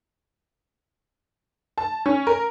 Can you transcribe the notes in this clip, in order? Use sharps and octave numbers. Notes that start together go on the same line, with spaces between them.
A5
C#4
A#4